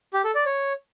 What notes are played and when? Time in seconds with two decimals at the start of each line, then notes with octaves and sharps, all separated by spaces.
0.14 G4
0.24 A4
0.35 D5
0.46 C#5